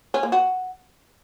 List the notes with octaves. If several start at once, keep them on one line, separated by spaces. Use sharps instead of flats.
C#4
A#3
F#4